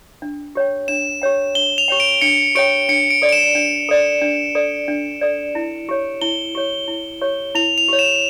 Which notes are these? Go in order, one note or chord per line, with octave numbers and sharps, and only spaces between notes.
D4
G4 C#5 G5
D4 E7
G4 C#5 G5
D4 G7
F7
G4 C#5 G5
D7
D4 C#7
G4 C#5 G5 D7
D4 C#7
D7
A4 D5
D7
E7
D4
A4 D5
D4
A4 D5
D4
A4 D5
E4
G4 C#5
E4 G7
G4 C#5
E4
G4 C#5
E4 F7
F7
G4 C#5
E7